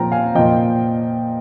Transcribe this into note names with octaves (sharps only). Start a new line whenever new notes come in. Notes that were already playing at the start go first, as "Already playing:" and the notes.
Already playing: A#2 F3 G5 A#5
F5 G#5
A#2 F3 D#5 G5